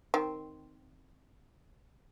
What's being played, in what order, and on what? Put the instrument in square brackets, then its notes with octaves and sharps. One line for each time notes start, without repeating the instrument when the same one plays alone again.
[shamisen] D#3 C4